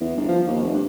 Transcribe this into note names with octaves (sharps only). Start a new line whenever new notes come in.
E2
G1
F3
D#2
F1
G2